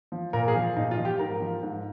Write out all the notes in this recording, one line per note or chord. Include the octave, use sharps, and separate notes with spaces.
F3
A#2 A#4
G#4
F3
A#2 D#4
F4
F3
G4
G#2 A#4
F3
G#2